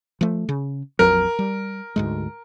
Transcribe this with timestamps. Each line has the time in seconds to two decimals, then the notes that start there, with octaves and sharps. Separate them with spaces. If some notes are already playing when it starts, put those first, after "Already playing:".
0.21 F3 A3
0.49 C#3
0.99 A#1 F2 F#3 A#4
1.39 G3
1.96 D2 G#2 G#3